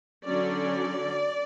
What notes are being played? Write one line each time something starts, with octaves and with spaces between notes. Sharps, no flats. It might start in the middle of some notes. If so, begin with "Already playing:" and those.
D3 F#3 C#4 D5